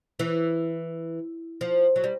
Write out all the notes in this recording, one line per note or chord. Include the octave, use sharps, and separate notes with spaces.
E3
F3
F#3
G3